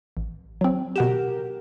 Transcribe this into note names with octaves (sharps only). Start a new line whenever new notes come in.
A1
F#3 C4
B2 G4 A#4 F#5 E7